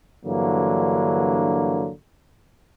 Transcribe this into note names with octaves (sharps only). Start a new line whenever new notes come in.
G2 D3 E3 F#3 A#3